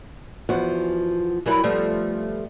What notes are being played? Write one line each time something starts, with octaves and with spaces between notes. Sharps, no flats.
E2 F3 B3 F#4
E3 F#3 G3 E4 A#4
F3 G3 A3 B3